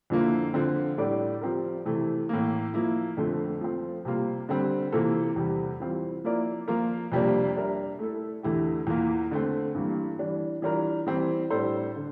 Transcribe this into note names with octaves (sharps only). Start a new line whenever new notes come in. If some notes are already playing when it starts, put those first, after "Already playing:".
F2 D3 F3 A#3 E4
D3 F3 C4
A2 G3 D4 A4 D5
F3 C4 G4 A#4
C3 E3 A3 E4
A2 E3 A#3
F3 A#3 E4
F2 D3 A3 C4
F3 A3 C4
C3 G3 A#3 F4
D3 G3 C4
C3 E3 A#3 F4 A4
E2 C3 G3
E3 G3 C4 F4
F3 A#3 E4 A#4 D5
F3 A#3 F4 A#4
F2 C3 G3 A#3 D4
G3 D4 G4 A#4 E5
A3 E4 A4
E2 D3 A3 E4 G4
E2 E3 A#3 F4
D3 A3 C4
G2 E3 G3 A#3
E3 G3 D4
E3 G3 D4 F4 A#4
E3 G3 C4
A2 G3 D4 A4 C5
D3